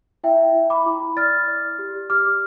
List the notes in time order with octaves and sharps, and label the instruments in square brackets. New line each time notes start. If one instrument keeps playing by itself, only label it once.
[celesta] E4 E5 G5
E4
B5 D6
E4
D5 F6 A6
D5
G4
G4 D6 F6